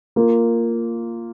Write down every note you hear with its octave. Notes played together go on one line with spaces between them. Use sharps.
A#3 F4 A#4